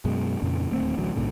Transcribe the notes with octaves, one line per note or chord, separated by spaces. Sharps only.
F#2 B2 G#3
F2 A#2 C#3
D1 D#2 A3 C4
A1 D2 F#3
A#1 G#2 B2 D3